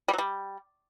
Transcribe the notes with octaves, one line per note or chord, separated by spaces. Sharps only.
G3
F#3
G3